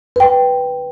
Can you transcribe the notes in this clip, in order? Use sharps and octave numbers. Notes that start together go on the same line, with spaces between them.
B4 G5